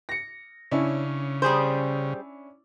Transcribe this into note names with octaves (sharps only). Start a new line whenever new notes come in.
A#6 C#7
C#3 C#4 D4 E4
G3 G#4 C5